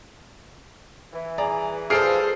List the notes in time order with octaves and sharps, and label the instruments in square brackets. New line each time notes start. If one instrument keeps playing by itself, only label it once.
[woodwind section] E3
[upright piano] G#4 D5 A#5
[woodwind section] G2 F3 [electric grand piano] G#4 A4 C5 [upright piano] F6 C7 D7